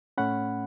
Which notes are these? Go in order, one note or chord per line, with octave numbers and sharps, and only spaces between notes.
A2 A3 C#4 F#5 B5